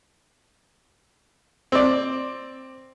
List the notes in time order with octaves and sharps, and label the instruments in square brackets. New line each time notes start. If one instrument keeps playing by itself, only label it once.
[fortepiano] C4 D5